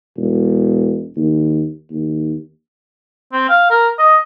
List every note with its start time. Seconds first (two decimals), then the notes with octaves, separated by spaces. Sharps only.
0.17 E1
1.16 D#2
1.91 D#2
3.33 C4
3.49 F5
3.70 A#4
3.99 D#5